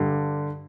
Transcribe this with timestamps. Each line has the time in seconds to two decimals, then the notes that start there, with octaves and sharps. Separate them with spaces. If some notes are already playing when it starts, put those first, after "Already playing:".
Already playing: G2 D3